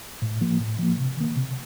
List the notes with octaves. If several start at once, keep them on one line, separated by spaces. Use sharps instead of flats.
A2
F3 A#3
A2
F3 A#3
C3
D#3 A#3
C3